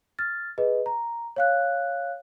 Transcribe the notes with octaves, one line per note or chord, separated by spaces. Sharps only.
F6 A6
G#4 B4 D#5
A#5
C#5 F5 F#6